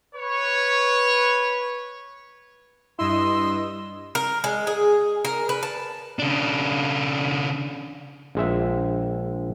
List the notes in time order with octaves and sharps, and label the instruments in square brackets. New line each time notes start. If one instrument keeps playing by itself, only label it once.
[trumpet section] B4 C#5
[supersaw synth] G2 D#5 E6 [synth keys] E4 [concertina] C6
[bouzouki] A#4
G#3
G#4
A#4
B4
A5
[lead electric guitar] C#3 D4
[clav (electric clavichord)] A#1 G#3 E5